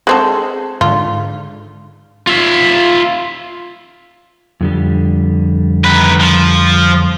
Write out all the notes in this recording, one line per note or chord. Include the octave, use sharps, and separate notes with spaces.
G#3 C4 A4
G#2 D3 F4
F4 E5
F2 D3 G3
D#3 B4
F3